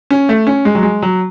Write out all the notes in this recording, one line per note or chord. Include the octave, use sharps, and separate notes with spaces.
C#4
A3
C#4
G#3
F#3
G#3
F#3